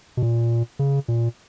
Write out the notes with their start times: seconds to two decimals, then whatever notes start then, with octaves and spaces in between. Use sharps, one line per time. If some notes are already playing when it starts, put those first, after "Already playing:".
0.17 B2
0.22 A#2
0.79 C#3
1.08 A#2